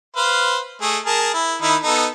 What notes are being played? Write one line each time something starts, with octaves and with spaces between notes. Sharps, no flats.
B4 C5 F5
A3 G#4 D#5
G#4 A#4 A5
E4
D#3 D#4 E4
B3 D#4 A4